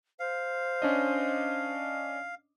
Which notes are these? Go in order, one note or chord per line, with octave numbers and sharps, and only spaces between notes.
C5 F5
C#4 D4 D#5